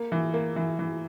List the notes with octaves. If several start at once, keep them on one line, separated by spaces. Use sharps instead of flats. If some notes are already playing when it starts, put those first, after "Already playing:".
Already playing: A#3
E3
A#3
E3
E3